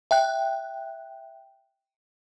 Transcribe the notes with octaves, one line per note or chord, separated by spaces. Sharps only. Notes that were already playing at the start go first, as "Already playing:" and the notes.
E5 G5 F#6